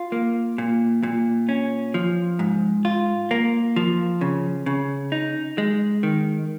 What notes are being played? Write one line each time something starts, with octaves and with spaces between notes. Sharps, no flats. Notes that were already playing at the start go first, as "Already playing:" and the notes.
Already playing: F4
A#3
A#2
A#2
C#4
F3
G#2
F4
A#3
F3
C#3
C#3
D#4
G#3
D#3